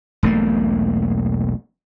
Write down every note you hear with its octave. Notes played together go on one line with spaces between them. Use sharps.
E1 B1 A3 A#3